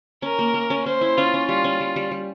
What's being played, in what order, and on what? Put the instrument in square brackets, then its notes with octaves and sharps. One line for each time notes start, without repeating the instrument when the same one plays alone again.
[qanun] C#4 [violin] A#4
[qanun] A#3
A#3
C#4
[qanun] C#4 [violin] C5
[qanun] E4
[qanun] C#4 [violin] F4
[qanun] C#4
[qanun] G3 [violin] F4
[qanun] C#4
G3
G3
G3